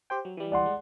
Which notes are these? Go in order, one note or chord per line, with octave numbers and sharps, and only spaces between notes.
G4 C5 G5
F#3
E3 G3
D5 F#5 C6
G#3